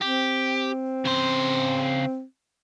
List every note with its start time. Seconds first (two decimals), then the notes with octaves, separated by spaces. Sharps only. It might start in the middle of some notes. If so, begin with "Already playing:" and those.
0.02 C4 G4
1.05 C#3 C5